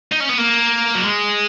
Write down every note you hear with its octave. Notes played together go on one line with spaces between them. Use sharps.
D#4
C#4
B3
A#3
F#3
G#3